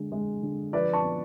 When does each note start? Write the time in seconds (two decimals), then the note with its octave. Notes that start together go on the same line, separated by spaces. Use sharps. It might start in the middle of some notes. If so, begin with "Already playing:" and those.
Already playing: D3 G#3
0.12 G#3
0.43 D3
0.73 F3 B4 D5
0.93 A5 C#6
1.04 B3